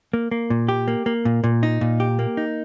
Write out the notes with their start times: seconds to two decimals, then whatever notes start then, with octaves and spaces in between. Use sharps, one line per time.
0.13 A#3
0.31 A#3
0.50 A#2
0.69 G4
0.88 A#3
1.06 A#3
1.25 A#2
1.44 A#2
1.63 D#4
1.81 A#2
2.00 G4
2.19 A#3
2.37 D#4